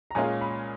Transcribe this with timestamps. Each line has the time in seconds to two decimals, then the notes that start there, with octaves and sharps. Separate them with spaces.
0.11 A#5
0.15 A#2 G#3 C#4 F4 G#4 G#5
0.41 B5